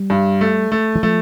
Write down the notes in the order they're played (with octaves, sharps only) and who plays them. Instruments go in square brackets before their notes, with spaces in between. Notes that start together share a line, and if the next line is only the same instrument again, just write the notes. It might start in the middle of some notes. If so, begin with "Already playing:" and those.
Already playing: [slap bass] G3
[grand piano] G2
A3
A3
[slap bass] E3
[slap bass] F3 [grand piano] A3